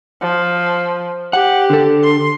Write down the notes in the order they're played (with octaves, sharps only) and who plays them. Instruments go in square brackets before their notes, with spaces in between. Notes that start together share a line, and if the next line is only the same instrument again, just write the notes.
[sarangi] F3
[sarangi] G4 [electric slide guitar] F#5
[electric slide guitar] D3 A4
[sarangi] C6